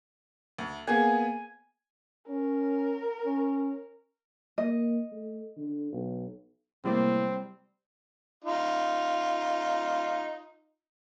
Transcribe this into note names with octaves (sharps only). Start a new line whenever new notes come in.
D2
A#3 B3 G#4 G#5
C#4 A#4
C#4
A#3 D#5
A3
D3
B1
A2 C3 G3 A#3 C4 D5
D#4 F4